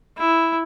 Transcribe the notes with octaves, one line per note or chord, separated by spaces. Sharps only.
E4